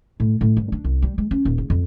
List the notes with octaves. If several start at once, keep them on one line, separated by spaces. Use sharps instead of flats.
A2
A2
G2
D4
C2
G3
G#3
C#4
D#1
C#3
F2